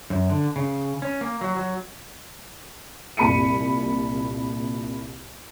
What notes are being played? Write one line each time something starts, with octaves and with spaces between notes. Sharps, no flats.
F#2
D3
C#3
C#4
A#3
F#3
F#3
C2 A#2 B5 C#7 D#7